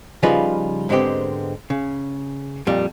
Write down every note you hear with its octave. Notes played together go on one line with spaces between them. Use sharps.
C#3 F3 G3 D#4 F4 B4
G#2 D3 G#3 B3 C4 G4
C#3
F2 A#2 G3